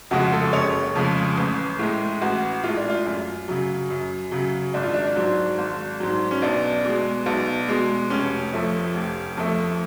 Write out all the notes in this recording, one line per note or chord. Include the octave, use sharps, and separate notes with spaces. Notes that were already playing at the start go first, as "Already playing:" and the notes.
F2 C#3 G#3 F#4
A4
F#1 C#5
F2 C#3 G#3
A1
A2 G#3
A1 F#4
A2 G#3 F4
D4
F4
F#2
C#3 F#3
F#2
C#3 F#3
G#1 D4
F4
D4
G#2 F#3
G#1
G#2 F#3
C#4
B1 D4
B2 G#3
B1
B2 G#3
F1 C#4
F2 F3 A3
F1
F2 F3 A3